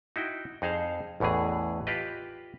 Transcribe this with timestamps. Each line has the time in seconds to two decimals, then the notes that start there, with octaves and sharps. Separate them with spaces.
0.16 D#4 E4 F#4 G5
0.62 F2 D#4 G#4 C5 F5
1.20 A1 E2 A2 E3 G#4
1.87 F4 G4 B4 D#5